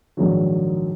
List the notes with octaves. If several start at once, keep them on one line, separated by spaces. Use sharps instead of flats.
A#1 G#2 D#3 F#3